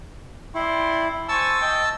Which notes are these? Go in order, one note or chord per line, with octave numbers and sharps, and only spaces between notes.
E4 D5 G5 C6
C5 G#5 A5 C#6 E6
D#5 G5